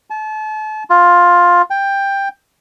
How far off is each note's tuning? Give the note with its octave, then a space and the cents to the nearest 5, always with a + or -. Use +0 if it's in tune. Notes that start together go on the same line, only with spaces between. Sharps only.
A5 -35
F4 +10
G5 +10